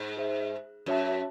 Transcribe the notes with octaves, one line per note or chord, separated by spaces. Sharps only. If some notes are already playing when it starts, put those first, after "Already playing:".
Already playing: G#2
G#4 C5 E5
F#2 F#4 C#5 E5 A5